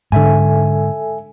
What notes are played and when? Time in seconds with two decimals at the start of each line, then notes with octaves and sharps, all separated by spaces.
0.12 G#2 D3 A4 E5 G#5